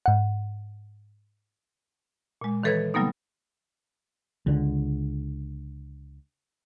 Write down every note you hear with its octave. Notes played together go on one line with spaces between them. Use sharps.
G#2 F#5
A#2 G#3
D#3 E3 A4 B4 C#5 G#6
C#3 F#3 G3 A#3 B3 D#4
C#2 D3